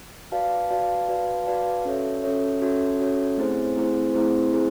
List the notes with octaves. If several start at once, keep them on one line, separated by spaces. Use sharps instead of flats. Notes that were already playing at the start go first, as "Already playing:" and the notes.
F#4 B4 D5 F5 A5
F#4 B4 D5 F5 A5
F#4 B4 D5 F5 A5
F#4 B4 D5 F5 A5
C#4 F#4 A4 C#5 E5
C#4 F#4 A4 C#5 E5
C#4 F#4 A4 C#5 E5
C#4 F#4 A4 C#5 E5
A3 C4 E4 G#4 C5
A3 C4 E4 G#4 C5
A3 C4 E4 G#4 C5
A3 C4 E4 G#4 C5